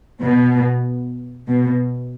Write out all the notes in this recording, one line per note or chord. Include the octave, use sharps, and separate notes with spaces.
B2
B2